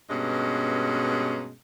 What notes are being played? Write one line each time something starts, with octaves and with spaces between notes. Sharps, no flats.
G2 B2 G#3 A#3 C#4